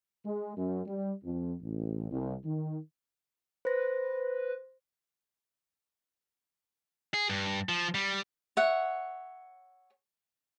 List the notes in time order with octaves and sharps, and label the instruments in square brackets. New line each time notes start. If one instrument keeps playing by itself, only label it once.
[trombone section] G#3
F#2
G3
F2
A1
C2
D#3
[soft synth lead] B4 [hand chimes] C5 A#6
[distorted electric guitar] G#4
G2
F3
G3
[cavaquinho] C#5 E5 F#5